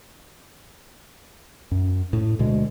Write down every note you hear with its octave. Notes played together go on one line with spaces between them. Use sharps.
F#2
A2
D2 B2 G#3